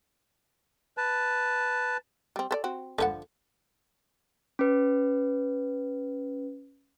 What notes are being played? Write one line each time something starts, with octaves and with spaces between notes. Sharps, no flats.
B4 A5
G3 C4
A4 C5 D5
C4 F#4
D3 F3 A4 B4 F#5
C#4 B4